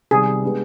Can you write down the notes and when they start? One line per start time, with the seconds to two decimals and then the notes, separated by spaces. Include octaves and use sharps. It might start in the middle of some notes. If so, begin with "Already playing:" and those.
0.11 C3 D#3 G3 B3 G#4
0.43 G#3 B3 D4 G4